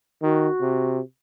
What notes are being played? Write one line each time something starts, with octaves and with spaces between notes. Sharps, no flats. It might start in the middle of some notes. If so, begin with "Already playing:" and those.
D#3 F#4
C3